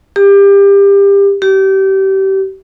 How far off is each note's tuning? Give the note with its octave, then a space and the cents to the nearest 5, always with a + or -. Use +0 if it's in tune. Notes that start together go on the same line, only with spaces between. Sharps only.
G4 +25
G4 -25